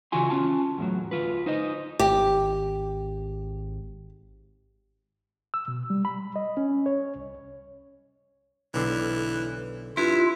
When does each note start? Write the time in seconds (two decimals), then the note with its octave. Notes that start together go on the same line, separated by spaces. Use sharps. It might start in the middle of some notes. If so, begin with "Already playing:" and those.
0.12 C#3 E3 F4 F#4 G#5 C6
0.30 C#4 F4 A5
0.78 E2 A2 F#3
1.11 D2 F4 B4
1.46 D#4 C5 D#5
1.99 G#1 G4
5.54 E6
5.68 B2
5.90 G3
6.05 B5
6.36 D#5
6.57 C#4
6.86 C#5
7.16 C2
8.74 B1 D3 E3
9.97 G2 E4 F4